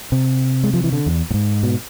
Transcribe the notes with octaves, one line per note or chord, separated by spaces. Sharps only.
C3
G#3
F3
E3
D3
E2
A2
G#2
B2